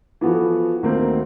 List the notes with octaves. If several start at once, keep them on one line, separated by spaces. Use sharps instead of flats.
E3 F3 B3 F#4 A4
D2 D#3 A#3 C4